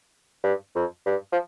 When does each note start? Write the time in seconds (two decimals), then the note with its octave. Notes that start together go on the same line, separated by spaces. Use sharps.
0.44 G2
0.75 F2
1.06 G2
1.32 F3